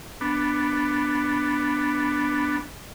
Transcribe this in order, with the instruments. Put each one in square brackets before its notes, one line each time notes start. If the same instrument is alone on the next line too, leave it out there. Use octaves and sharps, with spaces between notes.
[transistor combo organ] B3 D4